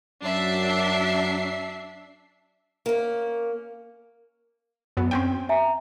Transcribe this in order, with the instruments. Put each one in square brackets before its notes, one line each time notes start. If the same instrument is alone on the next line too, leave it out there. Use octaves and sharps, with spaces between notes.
[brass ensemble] F#2 F#3 [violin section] D4 E5 C7
[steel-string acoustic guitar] A#3 C#4
[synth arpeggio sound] F#2 B3
C4 C#4 G5
[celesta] E5 G#5 A#5